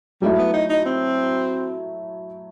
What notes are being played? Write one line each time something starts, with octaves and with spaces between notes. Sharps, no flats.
F#3 G3 A3 E4
B3
D#4
D#4
C4